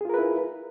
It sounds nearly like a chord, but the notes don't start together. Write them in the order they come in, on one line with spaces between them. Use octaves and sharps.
G#4 F4 A#4 B4 E4